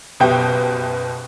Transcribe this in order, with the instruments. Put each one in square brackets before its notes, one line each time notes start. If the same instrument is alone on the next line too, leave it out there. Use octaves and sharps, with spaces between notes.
[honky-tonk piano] F#1 B2 G4 E5 G5